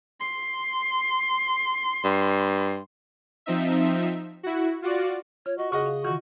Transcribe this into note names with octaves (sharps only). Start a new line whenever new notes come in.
C6
G2
F3 C4 D#4 E5
E4 F#4
F4 F#4 D5
F4 C#5
F#4 D#5
C#3 G#4 D#5 F#5 C#6
F5
D#3 E3 F4 F#4